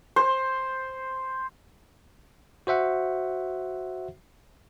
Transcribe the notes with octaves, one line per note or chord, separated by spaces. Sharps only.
C5
F#4 C5 E5 F#5